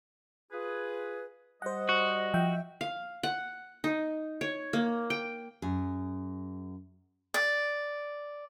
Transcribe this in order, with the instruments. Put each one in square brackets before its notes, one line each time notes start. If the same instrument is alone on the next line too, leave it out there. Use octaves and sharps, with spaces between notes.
[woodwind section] F4 G#4 B4
[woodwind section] G3 D#5 [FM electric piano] C5 F#5
[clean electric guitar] F#4
[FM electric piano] F3 E5 G5
[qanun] F5
F#5
D#4
C#5
A#3
G5
[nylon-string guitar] F#2 G#4
[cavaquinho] D5